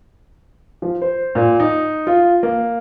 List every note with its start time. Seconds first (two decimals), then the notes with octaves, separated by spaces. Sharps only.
0.82 F3
1.02 C5
1.35 A#2
1.60 D#4
2.07 F4
2.43 A#3